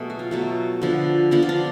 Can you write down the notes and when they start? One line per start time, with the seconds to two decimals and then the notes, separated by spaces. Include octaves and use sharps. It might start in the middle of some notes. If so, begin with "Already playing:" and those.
Already playing: B2 F#3 A3 G#4
0.10 F#4
0.19 F4
0.31 B2 F#3 A3
0.82 D3 F3 B3
1.31 D3 F3 B3 D4
1.43 F4
1.49 D4